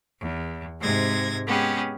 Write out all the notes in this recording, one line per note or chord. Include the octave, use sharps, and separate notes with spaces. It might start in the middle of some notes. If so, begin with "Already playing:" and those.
E2
G#2 C3 G#3 G#6 A#6
G#3 B3 C#4 G4 G#4